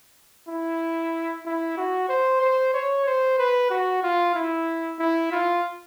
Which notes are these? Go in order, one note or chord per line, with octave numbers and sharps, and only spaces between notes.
E4
E4
F#4
C5
C5
C#5
C5
B4
F#4
F4
E4
E4
F4